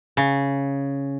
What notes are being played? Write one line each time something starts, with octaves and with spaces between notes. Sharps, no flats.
C#3